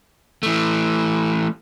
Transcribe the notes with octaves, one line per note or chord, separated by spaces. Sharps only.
E3 A3